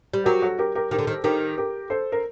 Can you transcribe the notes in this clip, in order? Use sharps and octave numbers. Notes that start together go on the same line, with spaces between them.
G3
F#3 G4 A#4
F#4 A4
G4 A#4
G4 A#4
D#3 G4 A#4
D3
D#3
D#3 G4 A#4
G4 A#4
A4 C5
A#4